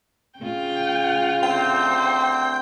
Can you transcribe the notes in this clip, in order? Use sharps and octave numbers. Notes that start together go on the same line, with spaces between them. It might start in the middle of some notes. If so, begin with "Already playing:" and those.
C#3 F4 G5
D2 C4 C5 G5